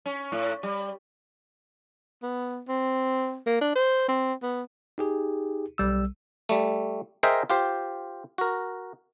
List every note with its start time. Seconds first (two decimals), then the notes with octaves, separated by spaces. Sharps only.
0.06 C#4
0.32 A2
0.63 G3
2.23 B3
2.68 C4
3.46 A#3
3.61 D4
3.76 C5
4.09 C4
4.43 B3
4.98 D#4 G4 G#4
5.78 B1 G3 E6
6.49 G3 A3
7.23 G#4 A#4 C5 D#5 E5 G5
7.50 F4 G4 C5
8.38 F#4 A#4